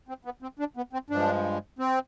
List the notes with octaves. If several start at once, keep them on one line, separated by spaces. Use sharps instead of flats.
C4
B3
C4
D4
B3
C4
G2 F3 G#3 D4
C4